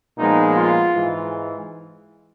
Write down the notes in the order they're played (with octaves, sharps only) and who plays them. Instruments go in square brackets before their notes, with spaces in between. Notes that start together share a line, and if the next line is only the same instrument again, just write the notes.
[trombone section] A#2 F3 G#3 B3 D#4
F4
G#2 E3 G#3